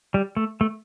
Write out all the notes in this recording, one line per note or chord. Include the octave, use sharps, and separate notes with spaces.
G3
A3
A3